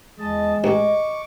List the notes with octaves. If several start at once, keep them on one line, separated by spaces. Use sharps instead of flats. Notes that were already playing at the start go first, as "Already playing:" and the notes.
E2 G#3 D#5 A5
A1 G#4 D#5 C#6 D6